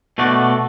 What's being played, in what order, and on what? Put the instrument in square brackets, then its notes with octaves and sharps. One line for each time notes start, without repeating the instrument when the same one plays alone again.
[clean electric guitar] B2 A3 F#4 D5